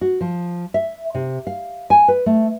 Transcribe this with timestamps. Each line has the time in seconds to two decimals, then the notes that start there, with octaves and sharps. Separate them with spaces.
0.01 F#4
0.21 F3
0.74 E5
1.14 C3
1.47 F5
1.90 G#5
2.08 B4
2.26 A3